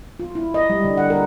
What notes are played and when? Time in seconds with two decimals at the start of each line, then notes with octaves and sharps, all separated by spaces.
0.20 F4
0.35 E4
0.54 D#5
0.70 G3
0.84 D3
0.97 F#5
1.10 A#4